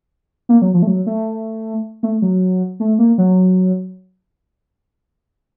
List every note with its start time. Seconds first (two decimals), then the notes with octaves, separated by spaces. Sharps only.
0.49 A#3
0.62 F#3
0.74 F3
0.82 A3
0.87 F#3
1.06 A3
2.03 A3
2.22 F#3
2.80 A3
2.99 A#3
3.18 F#3